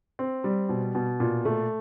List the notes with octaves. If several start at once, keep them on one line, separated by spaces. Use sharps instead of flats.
C4
G3
B2
B2
A#2
A3